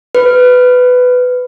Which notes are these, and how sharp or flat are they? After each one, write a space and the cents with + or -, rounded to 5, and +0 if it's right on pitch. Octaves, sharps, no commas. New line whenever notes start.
B4 +15